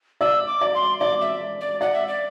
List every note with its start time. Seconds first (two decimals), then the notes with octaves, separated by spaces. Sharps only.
0.21 D5 E6
0.47 D6
0.61 D5
0.75 C6
1.00 D5 D6
1.21 E5
1.61 D5
1.81 D5 F#5
1.94 E5
2.08 D5